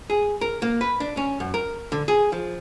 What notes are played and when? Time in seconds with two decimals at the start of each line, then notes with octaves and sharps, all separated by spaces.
0.10 G#4
0.41 A#4
0.62 A#3
0.81 B4
1.00 D4
1.17 C#4
1.40 F#2
1.54 A#4
1.92 D3
2.08 G#4
2.32 F3